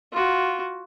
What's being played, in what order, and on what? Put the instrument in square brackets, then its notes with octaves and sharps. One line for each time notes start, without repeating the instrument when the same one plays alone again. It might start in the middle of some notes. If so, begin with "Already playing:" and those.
[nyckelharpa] F4 F#4